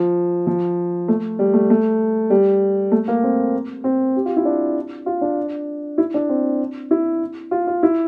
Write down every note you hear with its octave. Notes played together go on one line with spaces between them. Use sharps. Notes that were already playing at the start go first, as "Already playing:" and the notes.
Already playing: F3
F3
A3
G3
A3
A3
G3
A3
A#3
C4
C4
G4
F4
E4
D4
F4
D4
E4
D4
C4
E4
F4
F4
E4